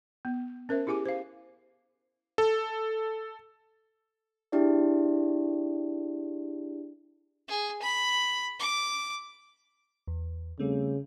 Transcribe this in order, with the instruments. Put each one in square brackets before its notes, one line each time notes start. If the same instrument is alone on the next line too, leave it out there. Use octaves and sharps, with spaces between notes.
[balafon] B3
C#4 A#4 C5 E5
E4 G4 G#4 G#5 D6
C5 F5
[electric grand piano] A4
[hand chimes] D4 E4 G4 G#4 D5
[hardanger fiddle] G#4
B5
D6
[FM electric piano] E2
[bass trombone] C#3 [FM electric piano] G3 A3 C4